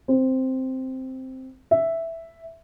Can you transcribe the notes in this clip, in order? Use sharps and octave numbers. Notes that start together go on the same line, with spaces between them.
C4
E5